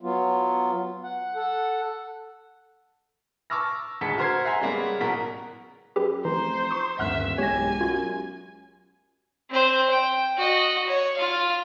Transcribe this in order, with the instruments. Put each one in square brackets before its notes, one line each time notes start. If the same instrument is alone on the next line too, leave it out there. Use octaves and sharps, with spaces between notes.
[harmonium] F#3 B3 F4
F#5
A4 F#5
[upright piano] A5 C#6 D6 E6 F6 A#6
D#1 D2 G#3 A5 B6 C#7
F#4 A#4 C5 F6 G#6 C7
E5 F#5 G#5 A#5 C6
C#3 G3 G#3 A#3 B3
A1 B2 A#4 F#5 B6
[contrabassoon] F#2 [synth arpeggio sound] G4 G#4 B4
[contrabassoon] F1 [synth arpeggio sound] E3 [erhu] C5 [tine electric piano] A#5
[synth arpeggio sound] C#6 D#6
[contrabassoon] D#1 [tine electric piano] D2 G2 A#3 [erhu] E5 [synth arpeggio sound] F#5 F6 F#6
[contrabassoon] E1 [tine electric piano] B1 G#3 G4 [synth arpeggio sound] C#5 A#6 [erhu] G#5
[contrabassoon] F#2 [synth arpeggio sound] F4 F#4
[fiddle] C4 C5
G5
F#4 D#5
C#5
F4 F5